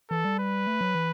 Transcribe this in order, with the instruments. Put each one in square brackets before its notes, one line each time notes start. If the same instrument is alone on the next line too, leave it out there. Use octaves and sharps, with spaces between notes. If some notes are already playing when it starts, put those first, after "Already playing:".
[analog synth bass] E3 [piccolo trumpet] A4
[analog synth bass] G3
[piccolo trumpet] B4
[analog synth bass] A3
F#3
E3